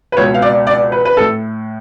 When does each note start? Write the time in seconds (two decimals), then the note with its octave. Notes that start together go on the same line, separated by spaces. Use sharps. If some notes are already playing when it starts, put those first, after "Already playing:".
0.12 B4
0.17 C#2 B2 C#5
0.34 F5
0.42 D5
0.67 D5
0.92 B4
1.05 B4
1.17 A4
1.20 A2